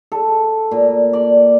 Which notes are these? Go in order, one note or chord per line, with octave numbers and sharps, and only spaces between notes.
A4
A#2
D5